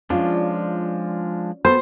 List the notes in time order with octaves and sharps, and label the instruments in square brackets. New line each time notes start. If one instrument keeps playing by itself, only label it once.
[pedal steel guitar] F3 G#3 D4 [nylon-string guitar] C#4 F4 D5
[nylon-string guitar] B3 F#4 A4 [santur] C5